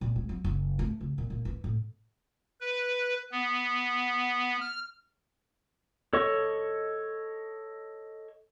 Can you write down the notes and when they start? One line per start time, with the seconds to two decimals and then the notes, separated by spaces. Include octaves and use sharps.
0.01 A#2
0.16 G#3
0.29 F#3
0.44 F#1
0.79 A3
1.01 C#3
1.18 A#2
1.30 A#2
1.45 E3
1.64 A2
2.61 B4
3.32 B3
4.61 F6
6.13 A4 C#5 D#5 C#6